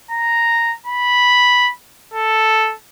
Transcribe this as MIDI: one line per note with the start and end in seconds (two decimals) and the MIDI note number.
0.11 0.74 82
0.86 1.70 83
2.14 2.75 69